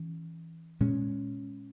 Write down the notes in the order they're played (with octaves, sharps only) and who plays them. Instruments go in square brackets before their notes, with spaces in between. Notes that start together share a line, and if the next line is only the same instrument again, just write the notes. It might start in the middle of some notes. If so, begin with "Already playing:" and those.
Already playing: [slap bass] E3 C#4
A#2 G#3 C#4